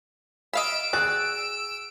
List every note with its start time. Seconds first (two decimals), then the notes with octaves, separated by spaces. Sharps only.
0.53 D#5 F5 B5 E6 D7
0.93 F#4 G#4 D5 F#6